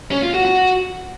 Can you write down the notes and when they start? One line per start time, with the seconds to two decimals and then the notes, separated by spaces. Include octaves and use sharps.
0.11 C#4
0.22 F4
0.34 F#4
0.45 F#4